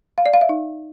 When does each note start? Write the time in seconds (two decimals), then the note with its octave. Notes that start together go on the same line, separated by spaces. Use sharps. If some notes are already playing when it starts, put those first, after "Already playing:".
0.18 F5
0.26 D5
0.34 F5
0.41 E5
0.49 D#4